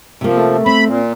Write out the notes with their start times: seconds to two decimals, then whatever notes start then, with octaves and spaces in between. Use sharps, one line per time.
0.21 C3 F3 A#3
0.37 A3
0.66 C4 B5
0.86 A#2